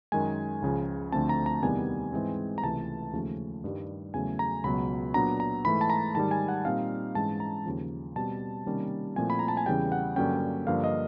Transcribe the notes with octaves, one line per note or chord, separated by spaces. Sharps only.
F#2 D#3 G#3 G#5
C#2 C#3 F3
D2 D3 F3 A3 C4 A5
A#5
A#5
E2 C3 D#3 G3 B3 G#5
G#2 E3 G#3 C4
A#5
C#2 C3 E3 A3 A5
D#2 C#3 F3 A3 C#4
G2 D#3 G3
E2 C#3 F#3 A3 G#5
A#5
C#2 B2 F#3 B3 B5
A#2 F#3 B3 D4 A#5
A#5
G#2 E3 A3 B5
A5
A#5
G#2 D#3 G3 A5
G#5
F#5
A#2 G3 C4 D#4 F5
G#2 E3 G#3 C#4 A5
A#5
D#2 C#3 F3
B2 G3 C4 A5
C3 D#3 G3 A#3 C#4
A#2 F3 A3 C4 E4 G#5
B5
A#5
A5
G#5
E2 C#3 E3 G3 G5
F#5
G2 D3 F#3 A#3 C#4 G5
G2 D3 F3 A#3 F5
D#5